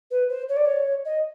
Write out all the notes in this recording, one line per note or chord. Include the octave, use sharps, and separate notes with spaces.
B4
C5
C#5
D5
C#5
D#5